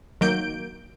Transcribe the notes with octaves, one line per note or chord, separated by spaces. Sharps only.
D#3 F#3 A#3 G6 D7